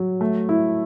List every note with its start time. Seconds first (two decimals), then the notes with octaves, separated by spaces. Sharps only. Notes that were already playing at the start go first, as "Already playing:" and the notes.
Already playing: F#3
0.21 A3
0.49 E4